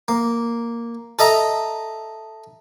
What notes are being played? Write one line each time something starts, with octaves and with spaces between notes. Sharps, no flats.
A#3
A4 D#5 E5 A#5